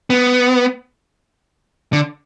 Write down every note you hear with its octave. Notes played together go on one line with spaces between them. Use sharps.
B3
D3